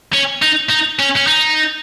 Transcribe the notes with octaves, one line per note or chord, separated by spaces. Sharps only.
C#4
D#4
D#4
C#4
C#4
D#4